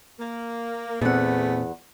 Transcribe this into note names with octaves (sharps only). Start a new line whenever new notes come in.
A#3
E2 A#2 A3 B3 C4 G#4 F#5